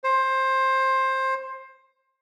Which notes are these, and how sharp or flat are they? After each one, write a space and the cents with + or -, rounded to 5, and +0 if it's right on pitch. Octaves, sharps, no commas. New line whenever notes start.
C5 +20